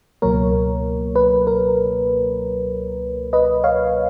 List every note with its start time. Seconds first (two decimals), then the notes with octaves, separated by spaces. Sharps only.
0.22 C#2 B2 F#3 A#3 A#4 C#5
1.16 B4
1.47 A#4
3.33 B4 D#5
3.64 C#5 F5